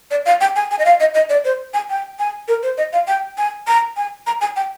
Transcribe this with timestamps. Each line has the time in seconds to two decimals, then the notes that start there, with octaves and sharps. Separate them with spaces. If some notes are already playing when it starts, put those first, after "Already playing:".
0.11 D5
0.26 F5
0.41 G5
0.56 G#5
0.71 G#5
0.79 D#5
0.85 F5
1.00 D#5
1.14 D#5
1.29 D5
1.45 C5
1.74 G#5
1.90 G5
2.19 G#5
2.48 A#4
2.63 C5
2.78 D#5
2.93 F5
3.08 G5
3.38 G#5
3.67 A#5
3.97 G#5
4.27 A#5
4.41 G#5
4.56 G5